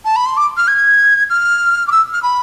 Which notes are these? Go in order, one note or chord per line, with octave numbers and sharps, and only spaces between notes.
A5
B5
C6
D6
F6
G#6
F6
D6
E6
F6
B5